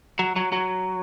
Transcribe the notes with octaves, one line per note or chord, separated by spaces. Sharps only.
F#3
F#3
F#3